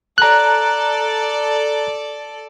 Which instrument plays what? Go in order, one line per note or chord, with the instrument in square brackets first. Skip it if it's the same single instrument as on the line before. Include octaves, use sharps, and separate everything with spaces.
[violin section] A4 D5 [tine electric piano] A#5 F#6